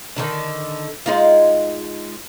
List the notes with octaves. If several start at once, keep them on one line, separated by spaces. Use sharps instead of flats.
D3 D#3 D4
G#3 D#4 F4